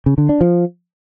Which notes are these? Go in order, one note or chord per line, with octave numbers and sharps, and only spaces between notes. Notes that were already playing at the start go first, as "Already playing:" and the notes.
C#3
D3
D4
F3